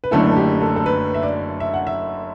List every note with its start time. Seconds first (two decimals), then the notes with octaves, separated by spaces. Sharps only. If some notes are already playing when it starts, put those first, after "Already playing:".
0.04 B4
0.11 F#1 F#2 D3 A3 E4 A4
0.31 A4
0.36 G4
0.61 A4
0.76 A4
0.86 B4
1.14 E5
1.23 D5
1.60 E5
1.74 F#5
1.87 E5